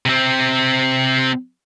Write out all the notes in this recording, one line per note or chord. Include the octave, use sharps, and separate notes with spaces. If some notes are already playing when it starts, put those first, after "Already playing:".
C3 C4